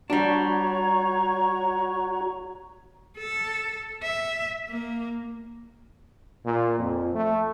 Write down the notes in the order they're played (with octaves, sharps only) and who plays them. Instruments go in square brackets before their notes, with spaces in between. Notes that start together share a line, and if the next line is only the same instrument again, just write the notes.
[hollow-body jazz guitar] G3 D4 [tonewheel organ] F#4 [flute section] C#5 A#5 C#6
[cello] A4
E5
A#3
[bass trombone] A#2
F2
A3